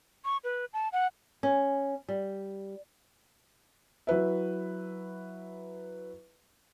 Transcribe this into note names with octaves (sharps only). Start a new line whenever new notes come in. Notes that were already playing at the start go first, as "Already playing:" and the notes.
C#6
B4
A5
F#5
C#4
G3
F#3 E4 B4 E5